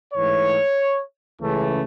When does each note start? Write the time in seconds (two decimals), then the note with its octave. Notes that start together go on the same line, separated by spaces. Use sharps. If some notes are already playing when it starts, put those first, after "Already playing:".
0.14 G#2 E3 A3 C#5
1.39 C#2 C#3 E3 A3